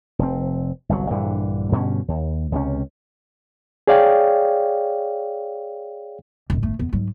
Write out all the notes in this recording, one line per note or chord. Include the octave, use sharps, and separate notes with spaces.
F1 C4
G1 C2 D3 F#3
A#1 G2 D3 E3
G2 B2 D3 C#4
D#2
C#2 C3 C#4
G#4 C#5 D5 F5 G5
E1 A1
G1 A3
E2 B3
G#2 F#3